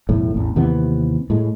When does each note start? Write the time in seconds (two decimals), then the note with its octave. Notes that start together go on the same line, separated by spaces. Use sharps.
0.09 B1 E2 A2
0.34 A1 E2
0.56 D#2 C3 E3 B3
1.30 A2 G#3